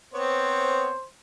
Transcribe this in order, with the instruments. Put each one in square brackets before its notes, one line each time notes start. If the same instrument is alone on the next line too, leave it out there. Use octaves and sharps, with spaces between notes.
[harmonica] B3 C4 C#5 [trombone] C5